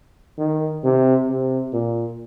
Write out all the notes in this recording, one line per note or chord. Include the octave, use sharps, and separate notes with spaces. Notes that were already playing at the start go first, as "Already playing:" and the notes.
D#3
C3
C3
A#2